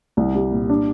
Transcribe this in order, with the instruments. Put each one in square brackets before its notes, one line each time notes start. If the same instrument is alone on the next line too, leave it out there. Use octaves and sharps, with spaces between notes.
[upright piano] C2
G3
A#2
D4